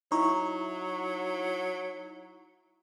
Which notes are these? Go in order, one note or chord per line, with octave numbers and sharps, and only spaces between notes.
F#3 D#4 E4 A#5 C#6